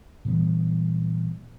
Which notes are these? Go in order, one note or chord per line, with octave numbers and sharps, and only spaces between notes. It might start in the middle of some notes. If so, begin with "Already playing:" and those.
A#2 E3 G3 B3